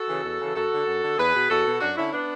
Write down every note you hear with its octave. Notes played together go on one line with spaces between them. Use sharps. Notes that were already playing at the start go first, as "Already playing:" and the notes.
Already playing: F#4 A4
C#3 E3
E2
C#3 E3
F#2 F#4 A4
D3
F#2
D3
E2 G#4 B4
B2
E2 F#4 A4
B2
F#2 D4 F#4
D3 C#4 E4
B3 D4